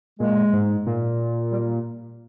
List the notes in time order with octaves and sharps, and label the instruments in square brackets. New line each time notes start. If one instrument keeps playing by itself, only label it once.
[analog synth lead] A#2 [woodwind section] G#3
[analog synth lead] G#2
A#2
[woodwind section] G3